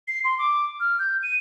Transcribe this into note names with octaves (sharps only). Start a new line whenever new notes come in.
C7
C6
D6
F6
G6
D#7